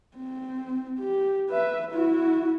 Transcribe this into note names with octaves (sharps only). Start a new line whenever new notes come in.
C4
G4
B4 E5
E4 F#4